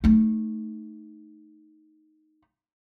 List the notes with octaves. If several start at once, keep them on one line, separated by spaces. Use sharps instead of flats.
A3 D#4